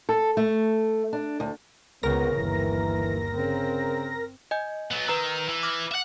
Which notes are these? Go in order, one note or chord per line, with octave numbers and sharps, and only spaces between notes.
A4
A3
D4
D2
C#2 C#3 B3 A#4 A#6
G1 D#2 E3
C#3 C4
D#5 G#5 G6
F#3 B3
D#3 B4 A#5 E6
E3
D6 F6 A#6
E5 F#5